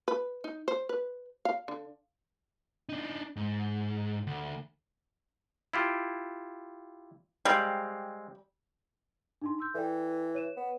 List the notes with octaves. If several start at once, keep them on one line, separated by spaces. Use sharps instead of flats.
B4
D#4
C5
B4
F5
D3
D4 D#4
G#2
D2
E4 F4 G4
G3 G#3 C4 F5
D4 D#4 C6
C6 E6 G6
E3 A4 D5 G5
C#5 D#7 E7
B3